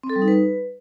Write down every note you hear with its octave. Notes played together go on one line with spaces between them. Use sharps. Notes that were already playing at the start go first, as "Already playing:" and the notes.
C4
A4
G3
D#4
B4